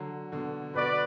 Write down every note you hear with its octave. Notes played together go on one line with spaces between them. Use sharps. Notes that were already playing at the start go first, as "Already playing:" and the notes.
Already playing: D3 F#3
B2 D3
B2 F#4 B4 D5